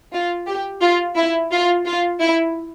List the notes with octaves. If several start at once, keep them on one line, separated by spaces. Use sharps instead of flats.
F4
G4
F4
E4
F4
F4
E4